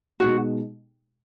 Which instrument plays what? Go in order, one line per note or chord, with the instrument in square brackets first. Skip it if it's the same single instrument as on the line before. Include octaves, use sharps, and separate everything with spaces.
[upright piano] B2 G#3 D#4 [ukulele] F#4